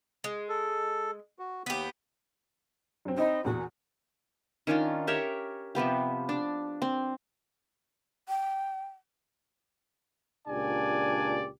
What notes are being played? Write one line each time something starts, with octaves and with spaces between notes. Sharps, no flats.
G#3
A4
F#4
D#2 B3 G4
F#2 C4
C4 D#4 B5
E2 A#2 F#4
D#3 C#4 D4 F4
G4 A#4 C#5 E5
C3 F3 B3 G4
D4
C4
G5
C#2 A#2 D4 G4 D5 G#5